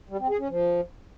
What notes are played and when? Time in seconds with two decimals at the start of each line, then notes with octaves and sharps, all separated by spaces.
0.09 G3
0.19 C4
0.29 G#4
0.39 C#4
0.49 F3